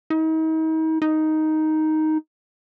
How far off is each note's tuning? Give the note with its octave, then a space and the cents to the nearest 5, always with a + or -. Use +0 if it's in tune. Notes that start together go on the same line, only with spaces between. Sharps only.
D#4 +40
D#4 +5